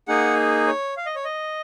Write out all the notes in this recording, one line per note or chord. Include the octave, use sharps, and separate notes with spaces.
A#3 D#4 G#4 F#5
C#5
F5
D#5
C#5
D#5